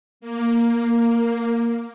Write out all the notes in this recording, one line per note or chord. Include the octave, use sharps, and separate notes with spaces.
A#3